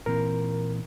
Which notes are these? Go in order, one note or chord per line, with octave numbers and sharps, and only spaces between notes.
A#2 E3 C4 A#4